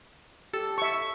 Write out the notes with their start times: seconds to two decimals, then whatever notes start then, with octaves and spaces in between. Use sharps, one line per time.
0.53 G4 A4
0.78 E5 C#6